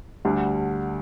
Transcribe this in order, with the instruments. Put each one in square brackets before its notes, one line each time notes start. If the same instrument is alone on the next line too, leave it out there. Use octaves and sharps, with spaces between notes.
[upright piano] D2 D3 G3 D4